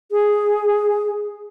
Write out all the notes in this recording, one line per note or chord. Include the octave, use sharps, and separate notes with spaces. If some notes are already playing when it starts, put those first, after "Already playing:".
G#4